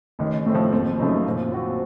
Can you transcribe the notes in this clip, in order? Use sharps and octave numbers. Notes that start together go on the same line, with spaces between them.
A1 D#3
A2 A3 C4
F3
F#1 C4
F#2 C#3 A3 D#4
A#2
F3 C4 F#4